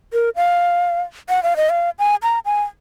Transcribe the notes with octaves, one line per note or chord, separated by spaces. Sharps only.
A#4
F5
F#5
F5
D#5
F5
G#5
A#5
G#5